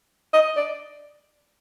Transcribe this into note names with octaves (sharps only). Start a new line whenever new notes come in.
D#5
D5